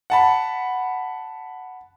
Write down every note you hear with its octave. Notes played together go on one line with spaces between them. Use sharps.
F#5 A5 B5